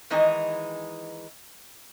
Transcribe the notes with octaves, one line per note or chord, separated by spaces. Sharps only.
D#3 E3 G#3 D#4 G#5